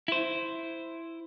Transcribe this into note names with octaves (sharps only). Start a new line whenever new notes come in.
E4 C5